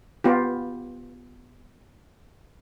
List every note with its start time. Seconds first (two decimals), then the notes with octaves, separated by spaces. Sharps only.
0.24 B3 F4 G4